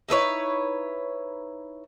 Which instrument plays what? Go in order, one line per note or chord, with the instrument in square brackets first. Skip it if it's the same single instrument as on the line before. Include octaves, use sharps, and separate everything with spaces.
[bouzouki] D#4 E4 B4 C#5